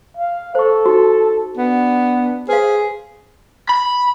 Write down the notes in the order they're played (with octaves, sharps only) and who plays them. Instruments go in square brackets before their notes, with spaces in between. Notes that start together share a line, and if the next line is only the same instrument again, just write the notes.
[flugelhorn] F5
[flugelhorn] A4 [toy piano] C5 C#6
[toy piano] D#4 F#4
[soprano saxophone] B3 [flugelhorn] D4
[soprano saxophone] G#4 [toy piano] B4 F5 [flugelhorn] C5
[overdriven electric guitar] B5